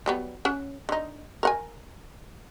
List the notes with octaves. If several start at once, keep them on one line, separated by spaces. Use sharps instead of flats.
F#3 G3 B3
C#4 F#5
D3 D#4
A#4 F#5 G#5